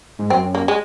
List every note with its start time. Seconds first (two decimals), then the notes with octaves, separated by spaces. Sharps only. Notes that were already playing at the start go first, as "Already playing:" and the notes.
0.19 G#2
0.30 F#2 C4
0.55 A#3
0.68 G#3